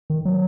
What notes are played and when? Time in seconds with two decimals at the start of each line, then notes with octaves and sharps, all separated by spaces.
0.10 D#3
0.25 F#3